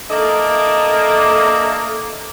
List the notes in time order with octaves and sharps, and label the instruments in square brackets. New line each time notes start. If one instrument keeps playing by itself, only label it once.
[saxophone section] A#3 D4 E4 A4 D#5